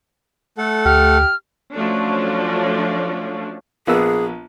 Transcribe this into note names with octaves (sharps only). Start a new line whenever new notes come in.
A3 A4 F#5
D2 G4 F6
F3 F#3 A3 C#4 D4
A#1 B3 G#4 E6